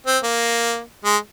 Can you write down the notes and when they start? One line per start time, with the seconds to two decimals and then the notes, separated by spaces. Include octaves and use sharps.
0.06 C4
0.23 A#3
1.05 G#3